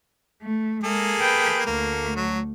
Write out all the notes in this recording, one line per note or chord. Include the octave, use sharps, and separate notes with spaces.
A3
G#3 A#3 G#4 A4
B4 G5
D2 A3 A#3
F#3